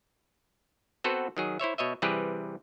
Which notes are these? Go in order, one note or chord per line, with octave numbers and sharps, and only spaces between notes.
B3 C4 F#4 A4 B4 C5
D#3 F#3 G#4
E4 C5 C#5 E5
B2 C#5 D#5 E5
C3 E3 G3 G4 G#4 B4